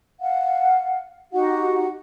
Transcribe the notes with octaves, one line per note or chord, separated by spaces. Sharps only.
F5 F#5
D#4 F#4 G4 F#5